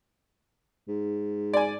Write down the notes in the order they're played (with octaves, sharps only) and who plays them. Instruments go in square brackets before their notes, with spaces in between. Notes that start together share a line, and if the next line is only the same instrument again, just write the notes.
[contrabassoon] G#2
[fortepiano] D5 G#5